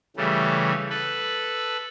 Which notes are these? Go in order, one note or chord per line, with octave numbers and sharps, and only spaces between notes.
C#3 E3 G3 A3
A4 B4